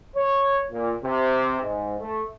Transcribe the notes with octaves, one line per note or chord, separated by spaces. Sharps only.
C#5
A#2
C3
G#2
A3